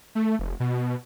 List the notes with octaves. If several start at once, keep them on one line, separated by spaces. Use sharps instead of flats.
A3
F1
B2